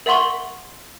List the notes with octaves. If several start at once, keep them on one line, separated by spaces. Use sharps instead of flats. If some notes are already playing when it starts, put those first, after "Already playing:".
A#4 E5 F#5 C6 C#6 G7